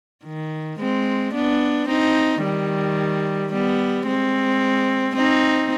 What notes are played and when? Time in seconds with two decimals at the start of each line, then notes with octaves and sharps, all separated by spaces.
0.24 D#3
0.79 G#3 C4
1.34 B3 D4
1.88 C4 D#4
2.43 D#3 G3
3.52 G3 B3
4.06 G#3 C4
5.15 C4 D#4